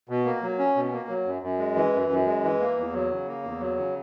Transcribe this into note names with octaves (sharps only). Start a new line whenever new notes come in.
B2
A#3
F#3
C#4
B2
A#3
F#3
F#2
F#2
G#3
E3
F#2
F#2
G#3
E3
A#3
E2
F#3
C#3
A#3
E2
F#3
C#3